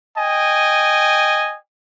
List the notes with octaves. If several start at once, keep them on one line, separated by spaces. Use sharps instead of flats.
D#5 G5 G#5